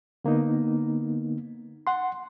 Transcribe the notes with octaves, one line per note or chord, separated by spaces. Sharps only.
D3 A#3 B3 D#4
F#5 C6